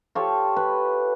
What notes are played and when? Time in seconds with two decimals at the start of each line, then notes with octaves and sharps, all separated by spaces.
0.15 F4 G4 A4 C#5
0.56 B4